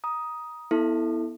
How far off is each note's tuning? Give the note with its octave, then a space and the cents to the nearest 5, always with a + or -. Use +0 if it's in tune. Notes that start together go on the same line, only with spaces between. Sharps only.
A#5 +30 D#6 +5
B3 +0 E4 -15 A4 +5